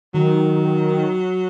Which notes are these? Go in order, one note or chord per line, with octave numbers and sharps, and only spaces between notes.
D#3 F#3